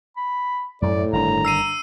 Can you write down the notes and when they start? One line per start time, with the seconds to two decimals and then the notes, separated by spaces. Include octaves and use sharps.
0.17 B5
0.82 F#2 A2 A3 D5
1.13 G1 D#3 D4 A#5
1.45 E6 C7 D#7